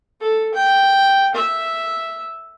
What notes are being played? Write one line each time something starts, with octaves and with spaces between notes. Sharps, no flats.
A4
G5
E5